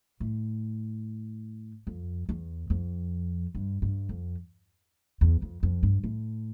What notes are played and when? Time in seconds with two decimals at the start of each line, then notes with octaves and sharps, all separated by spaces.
0.20 A2
1.87 F2
2.29 E2
2.70 F2
3.55 G2
3.82 G2
4.09 F2
5.21 E2
5.42 F2
5.63 F2
5.83 G2
6.04 A2